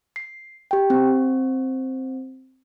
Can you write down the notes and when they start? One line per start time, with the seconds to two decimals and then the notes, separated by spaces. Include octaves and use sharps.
0.16 C7
0.71 G4 G5
0.90 C4